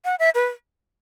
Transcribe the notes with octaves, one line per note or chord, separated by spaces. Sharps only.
F#5
E5
B4